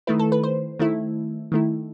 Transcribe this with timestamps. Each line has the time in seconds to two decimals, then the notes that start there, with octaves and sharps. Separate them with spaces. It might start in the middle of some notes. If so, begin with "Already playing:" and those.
0.07 D#3 A3 E4 B4
0.19 A4
0.32 B4
0.44 C5
0.79 D#3 A3 E4
1.52 D#3 A3 E4